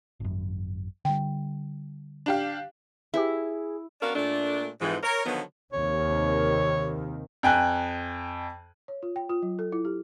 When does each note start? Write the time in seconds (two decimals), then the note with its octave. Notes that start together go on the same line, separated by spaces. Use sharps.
0.20 G#1 F#2
1.05 D3 G3 G5
2.26 D4 G4 F5
3.14 E4 G4 G#4 B4 E5
4.02 B3 C#4 D4 F#4 A#4 F5
4.15 A#2 A3 D4
4.81 F2 G#2 E3
5.03 A#4 C#5
5.25 D3 D#3 F3 F#3 B3
5.73 D#2 C3 D#3 C#5
7.43 F2 G5 G#5 F#6
8.88 C#5
9.03 F4
9.16 G5
9.30 F4
9.42 F#3
9.59 A4
9.72 E4
9.85 G4